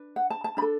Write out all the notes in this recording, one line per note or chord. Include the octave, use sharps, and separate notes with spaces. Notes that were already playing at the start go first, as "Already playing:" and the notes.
Already playing: D4 B4
F#5
A5
A5
D4 A4 B5